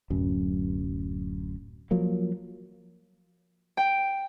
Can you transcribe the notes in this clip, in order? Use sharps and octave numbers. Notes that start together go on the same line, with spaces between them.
D1 F#2
F3 F#3 A#3
G5